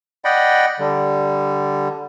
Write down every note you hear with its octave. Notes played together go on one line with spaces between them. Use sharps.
D5 D#5 F#5 G5 B5
D3 G3